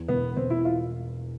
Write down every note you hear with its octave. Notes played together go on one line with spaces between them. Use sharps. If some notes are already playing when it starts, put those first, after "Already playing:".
Already playing: E2
E1 B3
E1 C4
E4
F4